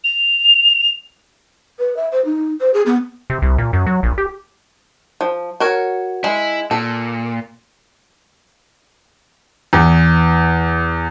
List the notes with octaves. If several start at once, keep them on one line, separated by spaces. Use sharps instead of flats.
F7
B4
E5
C5
D#4
C5
G#4
B3
C3
C2
A#2
F#2
F#3
A#1
G4
F3
F#4 A#4 C#5
G#3 E4
A#2 A4
E2